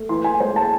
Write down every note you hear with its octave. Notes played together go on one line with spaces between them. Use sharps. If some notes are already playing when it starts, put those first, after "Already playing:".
Already playing: A3
E3 C6
G#5
G#3 C5
A5